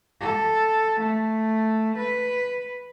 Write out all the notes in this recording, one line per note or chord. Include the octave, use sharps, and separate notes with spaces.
A4
A3
B4